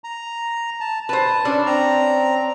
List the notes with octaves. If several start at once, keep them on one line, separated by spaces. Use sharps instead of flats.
A#5
A5
B4 C5 A5
C#4 D4 C5
C4 A#5